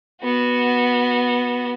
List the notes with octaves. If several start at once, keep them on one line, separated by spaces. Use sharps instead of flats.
B3 F#4